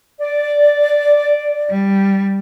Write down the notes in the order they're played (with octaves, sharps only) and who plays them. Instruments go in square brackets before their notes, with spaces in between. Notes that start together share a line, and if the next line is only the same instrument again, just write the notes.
[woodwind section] D5
[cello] G3